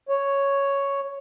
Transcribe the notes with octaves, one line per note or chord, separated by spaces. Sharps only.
C#5